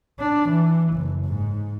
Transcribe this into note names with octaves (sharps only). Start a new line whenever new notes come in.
D4
E3
F#1
G#2